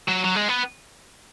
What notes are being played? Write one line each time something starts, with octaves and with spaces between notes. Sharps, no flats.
F#3
F#3
G#3
B3